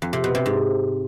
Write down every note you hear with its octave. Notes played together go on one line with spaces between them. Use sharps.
F2
C3
B2
C3
G#2